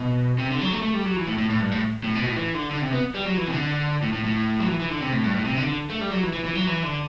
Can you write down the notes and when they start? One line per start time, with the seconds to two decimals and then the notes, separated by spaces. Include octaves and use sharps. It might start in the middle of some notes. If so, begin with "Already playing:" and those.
Already playing: B2
0.38 C3
0.50 D3
0.61 F#3
0.73 A3
0.83 A3
0.94 G3
1.05 F#3
1.16 E3
1.27 A2
1.38 A2
1.49 A2
1.61 G2
1.71 A2
2.04 A2
2.15 B2
2.27 A2
2.37 E3
2.54 D3
2.71 D3
2.82 C3
2.92 B3
3.14 G3
3.25 F#3
3.37 E3
3.47 C3
3.52 D3
4.02 A2
4.13 A2
4.24 A2
4.60 F#3
4.68 E3
4.80 E3
4.90 D3
5.01 C3
5.12 A2
5.24 G2
5.35 A2
5.45 C3
5.57 D3
5.67 D3
5.90 A3
6.01 G3
6.11 F#3
6.23 E3
6.33 E3
6.44 E3
6.55 F#3
6.67 E3
6.83 D3